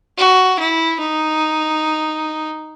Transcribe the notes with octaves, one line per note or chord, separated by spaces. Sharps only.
F#4
E4
D#4